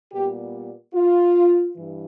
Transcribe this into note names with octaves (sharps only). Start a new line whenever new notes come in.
A#2 G3 B3 G4
F4
G2 E3